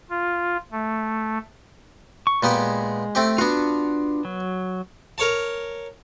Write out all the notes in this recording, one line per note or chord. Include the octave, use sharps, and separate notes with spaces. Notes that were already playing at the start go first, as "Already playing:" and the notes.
F4
A3
C#6
A#2 G#3 B3 G4
A3 C4 G4
B3 D4 F4 F#4
F#3
A#4 C#5 A5